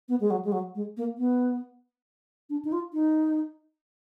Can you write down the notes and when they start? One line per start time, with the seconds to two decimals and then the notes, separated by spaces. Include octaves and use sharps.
0.09 B3
0.20 G#3
0.30 F#3
0.45 G#3
0.52 F#3
0.75 G#3
0.97 A#3
1.18 B3
2.50 D4
2.65 D#4
2.72 F4
2.93 D#4